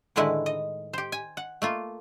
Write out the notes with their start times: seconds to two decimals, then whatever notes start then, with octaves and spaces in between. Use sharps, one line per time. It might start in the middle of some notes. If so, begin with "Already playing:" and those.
0.16 A2 D3 D#3 G#3 E4 B4
0.46 D#5
0.93 G4 C5
1.12 G#5
1.37 F#5
1.62 A3 A#3 F4